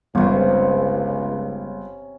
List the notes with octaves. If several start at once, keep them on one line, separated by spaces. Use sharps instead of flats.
G1 C#2 C3 C#4